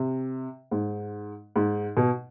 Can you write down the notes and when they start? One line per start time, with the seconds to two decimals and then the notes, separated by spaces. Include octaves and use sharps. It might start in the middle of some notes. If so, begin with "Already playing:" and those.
Already playing: C3
0.71 G#2
1.56 G#2
1.97 B2